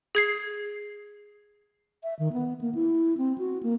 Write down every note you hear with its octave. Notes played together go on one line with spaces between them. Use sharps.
G#4 G#6 C7
E5
D#3
B3
A#3
E4
C4
F#4
A#3